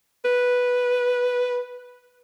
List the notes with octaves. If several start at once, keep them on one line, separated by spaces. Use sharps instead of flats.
B4